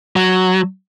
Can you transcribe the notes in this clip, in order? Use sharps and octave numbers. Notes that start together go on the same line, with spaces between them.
F#3